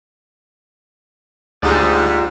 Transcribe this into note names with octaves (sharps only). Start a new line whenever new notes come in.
D2 G#2 F4 G4 D5